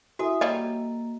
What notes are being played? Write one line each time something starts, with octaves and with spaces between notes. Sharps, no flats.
E4 F#4 A4 E5 G#5 D#6
G3 A#3 C#5 D#5 F5